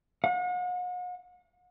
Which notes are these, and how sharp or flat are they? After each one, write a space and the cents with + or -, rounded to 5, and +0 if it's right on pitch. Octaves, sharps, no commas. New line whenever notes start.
F#5 -40